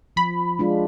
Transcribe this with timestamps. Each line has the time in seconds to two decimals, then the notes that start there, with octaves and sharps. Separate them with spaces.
0.16 F3 B5
0.59 G#3 D4 F4